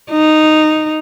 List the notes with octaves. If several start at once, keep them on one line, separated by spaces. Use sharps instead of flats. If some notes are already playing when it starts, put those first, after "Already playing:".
D#4